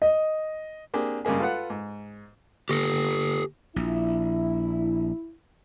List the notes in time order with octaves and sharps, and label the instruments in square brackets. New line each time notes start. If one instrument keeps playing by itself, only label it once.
[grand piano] D#5
[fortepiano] A#3 C4 D4 G4 G#4
G2 C#3 G#3 A#3 G#4
F4 A4 B4 F5 F#5
G#2
[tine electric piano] D3 A#3 A#6 [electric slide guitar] G4 A4
[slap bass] A#1 [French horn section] E4